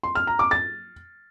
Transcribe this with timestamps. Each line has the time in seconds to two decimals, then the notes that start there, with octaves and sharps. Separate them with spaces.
0.03 C6
0.15 F6
0.27 A#5
0.39 D6
0.51 A6